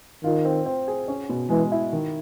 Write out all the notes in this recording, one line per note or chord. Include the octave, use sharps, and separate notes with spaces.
D#3 F4
C4
C4
G#4
C#4
B2
E3 G#3
E4
D#3